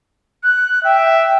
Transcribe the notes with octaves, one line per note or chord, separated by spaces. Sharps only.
F#6
E5 G5